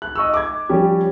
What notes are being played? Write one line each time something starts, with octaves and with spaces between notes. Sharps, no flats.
F#6
D#5 C#6 E6
D6 G#6
F3 G3 C#4 G4